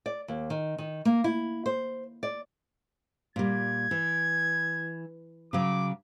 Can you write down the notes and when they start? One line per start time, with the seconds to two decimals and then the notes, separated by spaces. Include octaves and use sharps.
0.06 D5
0.28 D#2
0.50 D#3
0.78 D#3
1.05 A#3
1.24 E4
1.66 C5
2.23 D5
3.36 A#2 G3 G#6
3.91 E3
5.53 C#3 F#3 D6